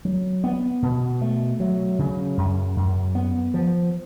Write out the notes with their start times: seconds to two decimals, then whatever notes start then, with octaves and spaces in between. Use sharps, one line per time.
0.05 F#3
0.44 B3
0.82 B2
1.21 A3
1.60 F#3
1.99 C#3
2.37 F#2
2.76 F#2
3.15 B3
3.54 F3